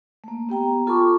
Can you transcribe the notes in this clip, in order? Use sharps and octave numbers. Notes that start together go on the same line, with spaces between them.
A3 A#3
B3 G4 G5 A#5
F4 A4 A5 B5 C#6 D6